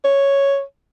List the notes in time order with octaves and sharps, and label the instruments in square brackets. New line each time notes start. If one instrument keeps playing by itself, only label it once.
[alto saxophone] C#5